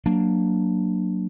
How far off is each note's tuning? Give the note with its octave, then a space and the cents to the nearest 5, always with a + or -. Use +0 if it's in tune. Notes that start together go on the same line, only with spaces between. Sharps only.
F#3 +0 A#3 +0 D4 +5